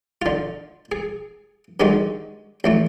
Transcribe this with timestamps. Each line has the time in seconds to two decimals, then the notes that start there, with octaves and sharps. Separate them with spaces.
0.22 D3 F4
0.92 G#4
1.80 G2 D3 D#3 G#3 F#4
2.64 A1 E3 A3